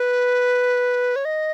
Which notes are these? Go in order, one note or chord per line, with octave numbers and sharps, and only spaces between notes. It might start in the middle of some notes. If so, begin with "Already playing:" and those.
Already playing: B4
C#5
D#5